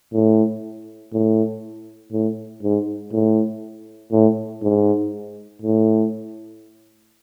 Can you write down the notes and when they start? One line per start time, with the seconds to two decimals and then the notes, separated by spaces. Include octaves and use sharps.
0.13 A2
1.13 A2
2.12 A2
2.63 G#2
3.12 A2
4.12 A2
4.62 G#2
5.62 A2